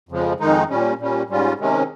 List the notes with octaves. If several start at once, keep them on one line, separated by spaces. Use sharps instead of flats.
F2 C#3 F3 G#3
F2 D#3 G#3 D#4
A#2 G3 C#4
A#2 G3 C#4
G#2 G3 C#4 F4
C3 D#3 G#3 C#4